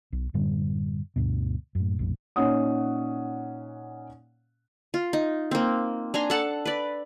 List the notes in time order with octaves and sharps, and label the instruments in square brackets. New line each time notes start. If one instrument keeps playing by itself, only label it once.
[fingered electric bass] B1
F#2 A2 D3 G3
D2 G2 B2
F#2 A2
A#1 F2 A2
[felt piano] A#2 C#4 D#4 C#5 F#5 D#6
[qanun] F4
D#4
A#3 C4
D4 G#5 A#5 C6
A4 F#5 A5
B4 D5